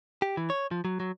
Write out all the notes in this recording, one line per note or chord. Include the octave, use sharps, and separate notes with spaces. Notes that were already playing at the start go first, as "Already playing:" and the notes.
G4
E3
C#5
F3
F#3
F#3